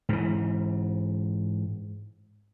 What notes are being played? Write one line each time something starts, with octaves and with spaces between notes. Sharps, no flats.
G#2 E3